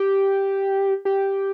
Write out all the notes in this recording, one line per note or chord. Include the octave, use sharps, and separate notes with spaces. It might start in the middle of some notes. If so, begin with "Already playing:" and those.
Already playing: G4
G4